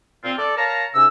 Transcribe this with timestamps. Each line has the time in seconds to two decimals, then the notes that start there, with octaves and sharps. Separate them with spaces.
0.24 A#2 C4 F4
0.38 A4 D5
0.57 A#4 C#5 F5 A5 A#5
0.95 G#2 C3 C#4 E6